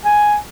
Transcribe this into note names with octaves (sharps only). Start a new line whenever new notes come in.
G#5